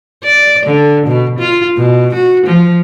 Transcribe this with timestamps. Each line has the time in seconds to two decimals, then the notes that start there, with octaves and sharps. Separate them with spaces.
0.24 D5
0.66 D3
1.07 B2
1.39 F4
1.78 B2
2.14 F#4
2.46 F3